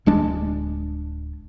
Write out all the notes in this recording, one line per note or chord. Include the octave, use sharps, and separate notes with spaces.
D1 G#3 D4